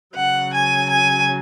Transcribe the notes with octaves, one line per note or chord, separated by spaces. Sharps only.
C#3 F#3 F#5
G#5
G#5